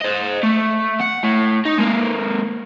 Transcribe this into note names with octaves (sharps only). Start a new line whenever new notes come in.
C5 D#5
A3
F#5
A2
D#4
G#3 A#3